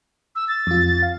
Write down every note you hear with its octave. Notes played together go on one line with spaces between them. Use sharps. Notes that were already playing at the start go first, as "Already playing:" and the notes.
E6
A6
F2 F4
F5